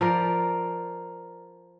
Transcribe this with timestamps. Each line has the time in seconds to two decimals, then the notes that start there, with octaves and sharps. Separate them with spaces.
0.01 F3 A#4 D5